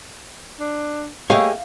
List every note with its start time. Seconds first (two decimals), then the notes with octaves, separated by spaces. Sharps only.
0.60 D4
1.30 A3 A#3 G4 G#4 C#5 D#5 F5